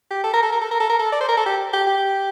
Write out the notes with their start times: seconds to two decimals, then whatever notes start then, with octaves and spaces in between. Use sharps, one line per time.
0.11 G4
0.24 A4
0.34 A#4
0.43 A4
0.52 A#4
0.61 A4
0.71 A#4
0.80 A4
0.90 A#4
0.99 A4
1.12 D5
1.21 C5
1.29 A#4
1.37 A4
1.46 G4
1.73 G4
1.87 G4